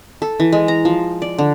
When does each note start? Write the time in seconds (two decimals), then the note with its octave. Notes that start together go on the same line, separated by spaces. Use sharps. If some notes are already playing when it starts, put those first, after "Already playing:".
0.22 A4
0.40 E3
0.52 G#3
0.68 A#5
0.85 F3
1.22 D5
1.38 D3